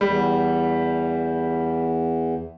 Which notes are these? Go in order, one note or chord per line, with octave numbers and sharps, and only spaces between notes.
E2 G3